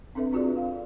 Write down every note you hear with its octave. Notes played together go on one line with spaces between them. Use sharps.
C4 D4 A4 B4 E5
C4 F4 F#4 G#4 D5
F5